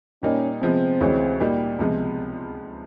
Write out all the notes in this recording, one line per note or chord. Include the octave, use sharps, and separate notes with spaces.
A#2 G3 A#3 C#4 D#4
C3 F3 G#3 B3 C4
D2 C3 E3 G#3 C#4
A#2 G3 A#3 D#4 G4
C#2 C3 F3 G#3 B3